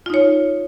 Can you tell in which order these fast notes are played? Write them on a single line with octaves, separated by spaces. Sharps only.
F4 D#4 C#5